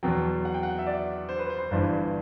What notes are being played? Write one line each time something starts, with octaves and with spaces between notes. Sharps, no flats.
E2 B2 F#3 G5
F#5
G5
F#5
E5
D5
C5
B4
C5
C5
G1 G2 E3 C5